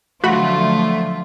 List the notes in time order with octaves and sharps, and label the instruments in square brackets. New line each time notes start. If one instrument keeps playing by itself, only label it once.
[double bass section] D3 F3 F#3 [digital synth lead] A3 [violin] F4 [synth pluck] F#4 B5